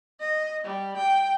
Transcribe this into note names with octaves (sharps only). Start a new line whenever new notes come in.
D#5
G3
G5